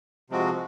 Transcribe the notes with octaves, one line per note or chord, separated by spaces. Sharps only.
C3 F3 G#3 C4 F#4